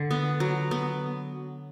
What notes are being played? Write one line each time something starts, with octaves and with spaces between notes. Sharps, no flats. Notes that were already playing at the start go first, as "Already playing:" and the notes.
Already playing: D3
B3
F#3
B3